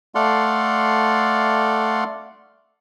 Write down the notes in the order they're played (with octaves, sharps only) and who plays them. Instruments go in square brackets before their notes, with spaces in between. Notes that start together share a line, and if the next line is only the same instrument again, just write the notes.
[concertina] A3 A4 D5 F5 F#5 C6